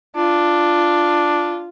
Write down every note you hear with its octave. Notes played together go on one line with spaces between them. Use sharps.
D4 F4